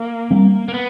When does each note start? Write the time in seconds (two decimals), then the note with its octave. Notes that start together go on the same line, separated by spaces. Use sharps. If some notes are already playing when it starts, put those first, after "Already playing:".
Already playing: A#3
0.31 G3 C4
0.68 A#3
0.74 B3